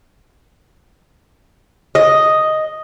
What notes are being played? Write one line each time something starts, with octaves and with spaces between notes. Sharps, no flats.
D#5